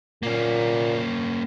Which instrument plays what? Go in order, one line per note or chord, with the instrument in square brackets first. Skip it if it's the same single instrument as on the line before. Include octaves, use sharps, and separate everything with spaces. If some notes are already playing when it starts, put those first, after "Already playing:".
[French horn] A#2 [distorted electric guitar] A#3 C#4